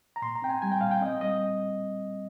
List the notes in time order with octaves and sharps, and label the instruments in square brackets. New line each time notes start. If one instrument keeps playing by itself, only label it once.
[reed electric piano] A#5
A#2 C6
A#5
C4 G5
G#5
G3 G#5
G5
A#2 F5
G5
C4 D#5
G3 D#5